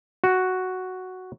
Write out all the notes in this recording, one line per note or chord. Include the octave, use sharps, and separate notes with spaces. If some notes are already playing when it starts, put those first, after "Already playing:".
F#4